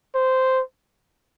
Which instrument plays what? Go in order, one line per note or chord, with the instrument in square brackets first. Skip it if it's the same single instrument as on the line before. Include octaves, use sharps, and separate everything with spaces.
[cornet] C5